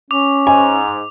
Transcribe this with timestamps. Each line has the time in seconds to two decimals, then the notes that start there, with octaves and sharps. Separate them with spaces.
0.11 C#4 D6
0.47 G#2 G#5